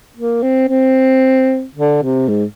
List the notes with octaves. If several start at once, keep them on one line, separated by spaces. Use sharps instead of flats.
A#3
C4
C4
D3
C3
G#2